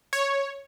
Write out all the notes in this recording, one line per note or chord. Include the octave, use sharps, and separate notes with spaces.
C#5